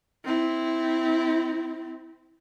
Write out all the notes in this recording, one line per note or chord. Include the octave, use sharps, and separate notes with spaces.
C4 E4